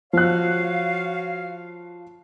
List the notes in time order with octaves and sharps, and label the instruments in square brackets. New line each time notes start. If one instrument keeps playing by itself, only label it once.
[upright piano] F3 F#6 [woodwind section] F#4 C#5 F5